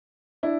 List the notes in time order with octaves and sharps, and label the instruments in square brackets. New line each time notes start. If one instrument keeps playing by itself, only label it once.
[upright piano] D4 E4